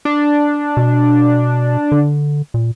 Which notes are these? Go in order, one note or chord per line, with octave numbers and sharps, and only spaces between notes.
D4
B2
D3
A#2